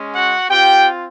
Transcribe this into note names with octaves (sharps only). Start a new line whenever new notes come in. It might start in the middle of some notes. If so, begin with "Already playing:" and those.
Already playing: G#3 C#4
F#4 F#5
C4 F4 G4 G5